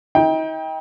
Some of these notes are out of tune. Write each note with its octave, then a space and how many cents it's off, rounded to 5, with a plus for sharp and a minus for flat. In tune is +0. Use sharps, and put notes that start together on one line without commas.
D#4 +40 G5 +10